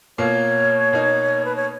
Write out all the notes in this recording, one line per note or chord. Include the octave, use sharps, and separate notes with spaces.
B2 A#3 F4 C#5
B2 A#3 D#4
B4
C#5